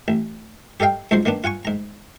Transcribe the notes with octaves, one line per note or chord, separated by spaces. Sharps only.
A1
G4 A4 D#5 F5 G5
C#2 G#2 F3 F#3 C5 C6
D#3 A#3 B3 D4
F4 F#5 G#5 C#6
G#2 A#5